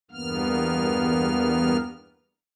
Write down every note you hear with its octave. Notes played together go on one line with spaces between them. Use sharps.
E2 G2 A#3 B3 F6